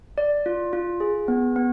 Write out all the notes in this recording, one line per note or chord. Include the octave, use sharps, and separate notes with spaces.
D5
F4
F4
G#4
B3
B3